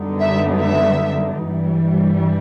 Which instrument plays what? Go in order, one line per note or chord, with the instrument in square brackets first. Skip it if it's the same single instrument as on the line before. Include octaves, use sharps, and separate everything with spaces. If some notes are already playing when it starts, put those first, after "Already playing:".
Already playing: [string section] F#2 D3 G3 B3 D#4
E5
E5
G2 E3 G3